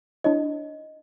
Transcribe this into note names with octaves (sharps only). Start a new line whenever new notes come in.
D4 E4 C#5 D#5